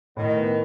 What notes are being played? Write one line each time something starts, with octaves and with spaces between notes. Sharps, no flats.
A2 D#3
B3